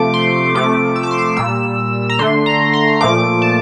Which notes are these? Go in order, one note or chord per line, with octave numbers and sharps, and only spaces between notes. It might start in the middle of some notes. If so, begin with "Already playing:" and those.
Already playing: C3 F3 A3 D6
C6
C3 F3 A3 D6
E6
D6
C6
D6
A#2 G3 E6
A#5
D3 A3 C6
A#5
C6
A#2 F3 A3 D6
A5